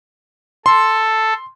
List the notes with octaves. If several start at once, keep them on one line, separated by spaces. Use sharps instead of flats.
A4 C6